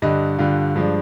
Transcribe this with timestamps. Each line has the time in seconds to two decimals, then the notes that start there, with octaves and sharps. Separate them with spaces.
0.02 G2 D3 G3 D#5
0.39 G2 D3 G3 F4
0.76 G2 F3 G#3 D4